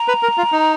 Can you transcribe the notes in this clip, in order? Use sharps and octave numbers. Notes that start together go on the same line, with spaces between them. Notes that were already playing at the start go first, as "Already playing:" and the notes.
Already playing: A#5
B4
A#4
F4
D#4